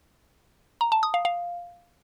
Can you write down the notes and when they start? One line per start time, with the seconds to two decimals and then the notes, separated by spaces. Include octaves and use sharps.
0.81 A#5
0.92 A5
1.03 D#6
1.14 F5
1.25 F5